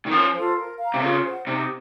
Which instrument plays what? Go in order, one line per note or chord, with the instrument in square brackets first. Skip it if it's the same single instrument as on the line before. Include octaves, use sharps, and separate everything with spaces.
[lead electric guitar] D#3
[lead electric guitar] F3 [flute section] C#4
[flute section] F4 A4 C5
A#4
F5 A#5
[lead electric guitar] C3
[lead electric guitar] C#3 [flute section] F4
[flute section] C5 F#5
[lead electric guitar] C3 [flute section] D#4